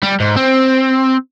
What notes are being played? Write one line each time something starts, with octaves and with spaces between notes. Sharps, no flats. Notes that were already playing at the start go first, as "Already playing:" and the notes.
G3
G#2
C4